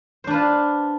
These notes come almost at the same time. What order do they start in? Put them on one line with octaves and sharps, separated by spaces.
C5 D4 B4 F4